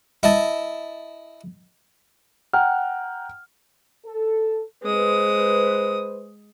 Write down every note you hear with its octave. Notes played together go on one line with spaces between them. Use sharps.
E4 D#5 A5
F#5 G5 A#5 F6
A4
G#3 B4 C5 D#6